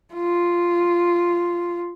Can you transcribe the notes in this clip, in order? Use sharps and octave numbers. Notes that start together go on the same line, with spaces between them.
F4